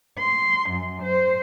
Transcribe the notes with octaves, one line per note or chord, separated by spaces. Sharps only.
C6
F#2
C5